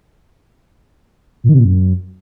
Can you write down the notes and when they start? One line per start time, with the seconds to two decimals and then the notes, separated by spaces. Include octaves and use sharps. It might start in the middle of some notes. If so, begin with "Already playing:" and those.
1.44 A#2
1.49 D#3
1.54 C3
1.59 A#2
1.65 F#2